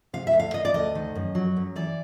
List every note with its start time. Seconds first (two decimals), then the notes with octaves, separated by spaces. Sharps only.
0.13 C3 F5
0.27 E5
0.33 D2
0.39 F5
0.54 D#3 D#5
0.65 D5
0.74 D2 D#5
0.95 D#3
1.15 F#2
1.35 F#3
1.56 F#2
1.76 E3 D5